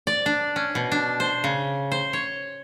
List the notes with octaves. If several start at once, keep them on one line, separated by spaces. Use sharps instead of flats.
D5
D4
C#4
B2
D4
C5
C#3
C5
C#5